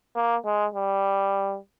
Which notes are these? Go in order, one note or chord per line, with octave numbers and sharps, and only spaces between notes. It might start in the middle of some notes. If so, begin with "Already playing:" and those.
A#3
G#3
G3